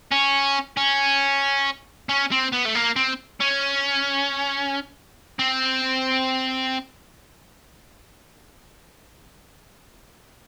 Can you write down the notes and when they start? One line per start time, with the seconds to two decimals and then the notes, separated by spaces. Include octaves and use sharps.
0.11 C#4
0.77 C#4
2.09 C#4
2.31 C4
2.52 B3
2.65 A3
2.75 A#3
2.96 C4
3.41 C#4
5.39 C4